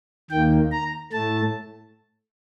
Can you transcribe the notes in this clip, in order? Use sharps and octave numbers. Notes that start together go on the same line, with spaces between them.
D#2 D#3 A#3 G5
A#5
A2 A3 A5